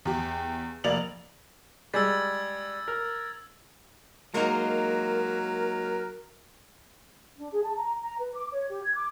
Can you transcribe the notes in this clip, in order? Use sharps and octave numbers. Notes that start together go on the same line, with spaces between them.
E2 G4
F1 A#3 D5 F7 F#7
G3 G#3 E6 G#6 A6
A#4
F#3 G#3 A#3 D#4 A#4
D4
G#4
A5
A#5
A#5
B4
D6
C#5
G4
G#6
D6